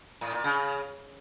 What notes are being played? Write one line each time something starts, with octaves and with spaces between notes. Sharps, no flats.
A2
A#2
C#3